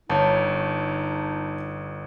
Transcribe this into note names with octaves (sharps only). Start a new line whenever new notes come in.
G1 D#4 C#5 A5